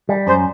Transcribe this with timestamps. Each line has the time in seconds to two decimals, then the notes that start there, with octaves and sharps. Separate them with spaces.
0.09 G3
0.27 F#2 C5